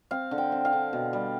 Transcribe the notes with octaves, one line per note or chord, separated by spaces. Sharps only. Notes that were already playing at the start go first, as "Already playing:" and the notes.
C4 F5
D3
G5
C4
F5
D3
B2
G3